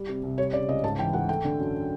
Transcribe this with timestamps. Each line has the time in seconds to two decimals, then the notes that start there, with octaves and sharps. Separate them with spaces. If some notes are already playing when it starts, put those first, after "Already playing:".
Already playing: G3
0.09 C3
0.23 C2
0.38 G3 C#5
0.53 C#3 D5
0.69 C#2 D#5
0.84 G#2 A5
0.99 E3 G5
1.13 G#2 F#5
1.29 A3 G5
1.44 D3
1.59 F#2